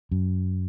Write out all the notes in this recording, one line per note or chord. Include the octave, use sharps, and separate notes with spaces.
F#2